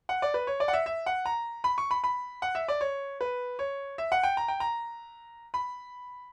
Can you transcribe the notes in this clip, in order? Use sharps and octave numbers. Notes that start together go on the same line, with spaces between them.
F#5
D5
B4
C#5
D5
F#5
E5
E5
F#5
A#5
B5
C#6
B5
B5
F#5
E5
D5
C#5
B4
C#5
E5
F#5
G5
A#5
G5
A#5
B5